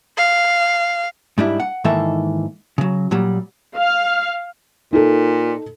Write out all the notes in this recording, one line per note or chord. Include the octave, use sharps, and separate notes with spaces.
F5
G#2 G3 D4 E4
F#5
G#2 D#3 E3 A#3 A4 E5
C#3 F#3
A#2 F#3 G3
F5
A#2 D#4 A4